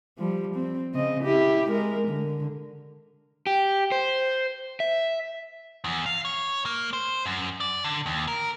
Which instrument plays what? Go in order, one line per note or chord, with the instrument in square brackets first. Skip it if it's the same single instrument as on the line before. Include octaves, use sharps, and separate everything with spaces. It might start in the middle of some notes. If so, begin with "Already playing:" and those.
[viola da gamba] F3 G3
C4
C#3 C4 D#5
E4 G4
G#3 A#4
D3
[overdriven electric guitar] G4
C5
E5
[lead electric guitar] E2
F5
C#5
A#3
C5
F#2
D5
D3
D#2
A#4